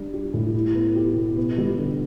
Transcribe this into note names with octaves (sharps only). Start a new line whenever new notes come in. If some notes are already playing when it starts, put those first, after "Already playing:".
Already playing: G3 D4
G4
A2
E4
B3
G4
B2
B3
G3
D3